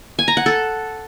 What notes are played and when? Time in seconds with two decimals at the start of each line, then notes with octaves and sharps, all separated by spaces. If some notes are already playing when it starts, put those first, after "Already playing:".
0.19 G#5
0.28 A#5
0.37 F#5
0.46 A4